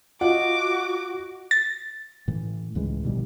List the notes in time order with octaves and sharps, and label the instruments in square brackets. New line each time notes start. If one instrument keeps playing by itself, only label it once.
[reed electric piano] F4 [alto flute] F#4 [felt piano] D#5 F#5 [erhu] D6
[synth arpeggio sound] A6
[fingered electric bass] A2 E3
C#2 A2 E3 G#3
A#1 B2 D#3 G3